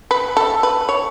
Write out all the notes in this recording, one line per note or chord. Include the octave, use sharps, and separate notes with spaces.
B4
A4
B4
C#5